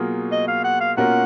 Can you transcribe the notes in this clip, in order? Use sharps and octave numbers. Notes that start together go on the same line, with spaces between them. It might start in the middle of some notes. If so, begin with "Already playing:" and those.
Already playing: B2 F#3 A#3 F4 G#4
D#5
F5
F#5
F5
B2 A#3 C#4 F4 A#4 F#5